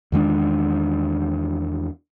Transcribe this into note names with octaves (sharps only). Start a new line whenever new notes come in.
E2 D#3 G#3 D4